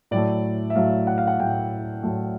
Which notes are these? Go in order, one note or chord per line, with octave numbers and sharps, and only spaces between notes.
A2 F#3 A3 D5
E5
A2 F#3 A3 F5
F#5
F5
F#5
A2 F#3 A3 G5
A2 F#3 A3